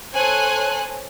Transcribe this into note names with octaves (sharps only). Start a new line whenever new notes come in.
A4 C5 C#5 G#5 F#6